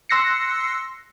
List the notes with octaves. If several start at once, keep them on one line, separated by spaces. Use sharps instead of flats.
C6 E6 F#6 A#6 C7 C#7